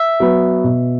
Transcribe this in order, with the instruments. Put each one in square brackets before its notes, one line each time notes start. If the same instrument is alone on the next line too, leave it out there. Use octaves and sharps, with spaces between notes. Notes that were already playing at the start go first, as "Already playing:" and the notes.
Already playing: [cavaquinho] E5
[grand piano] F#3 B3
B2